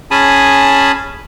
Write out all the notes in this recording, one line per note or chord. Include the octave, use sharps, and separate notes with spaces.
C#4 G#4 G#5 A5 B5 D#6